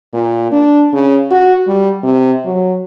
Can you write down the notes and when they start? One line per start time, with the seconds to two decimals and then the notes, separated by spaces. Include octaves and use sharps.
0.14 A#2
0.52 D4
0.93 C#3
1.31 F#4
1.67 G3
2.03 C3
2.46 F#3